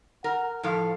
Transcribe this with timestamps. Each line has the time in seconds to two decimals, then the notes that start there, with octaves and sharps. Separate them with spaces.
0.24 A#4 F#5
0.63 A2 F3 A4 F5